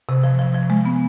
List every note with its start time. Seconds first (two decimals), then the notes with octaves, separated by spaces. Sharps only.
0.09 C3
0.24 F3
0.39 F3
0.54 F3
0.70 G#3
0.85 B3